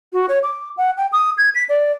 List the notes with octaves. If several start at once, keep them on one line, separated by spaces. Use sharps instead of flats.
F#4
C#5
D6
F#5
G5
D#6
G#6
B6
D5